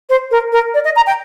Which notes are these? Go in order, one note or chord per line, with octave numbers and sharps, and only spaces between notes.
C5
A#4
A#4
D5
D#5
A#5
G5